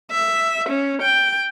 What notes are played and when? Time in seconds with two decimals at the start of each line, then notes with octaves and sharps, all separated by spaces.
0.11 E5
0.69 C#4
1.02 G5